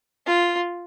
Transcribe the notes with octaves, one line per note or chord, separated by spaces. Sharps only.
F4